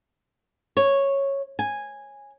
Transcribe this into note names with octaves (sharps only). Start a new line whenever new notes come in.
C#5
G#5